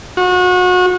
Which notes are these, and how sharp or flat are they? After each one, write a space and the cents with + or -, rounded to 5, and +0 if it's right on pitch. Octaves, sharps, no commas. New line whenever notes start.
F#4 -30